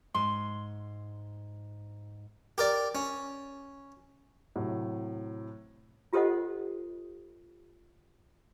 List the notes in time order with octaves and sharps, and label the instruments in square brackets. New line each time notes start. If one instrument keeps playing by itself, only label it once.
[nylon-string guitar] G#2 [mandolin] C6
[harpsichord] G4 A#4 D5
C#4
[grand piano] A2 C3 F#3
[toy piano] F4 G4 A4 C5 D#5 F#5